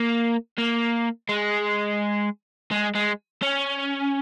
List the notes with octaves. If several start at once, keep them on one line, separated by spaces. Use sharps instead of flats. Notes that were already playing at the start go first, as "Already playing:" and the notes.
Already playing: A#3
A#3
G#3
G#3
G#3
C#4